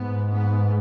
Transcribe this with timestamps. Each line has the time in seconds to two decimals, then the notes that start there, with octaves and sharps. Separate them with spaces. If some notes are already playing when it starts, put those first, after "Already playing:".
Already playing: G#2 B3
0.31 B3